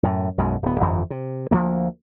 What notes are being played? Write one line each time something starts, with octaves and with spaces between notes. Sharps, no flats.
F#2 A2
B1 F#2 B2 G#3
D1 B3
G1 F2 E3 F3
C3
D2 F3 G#3 A#3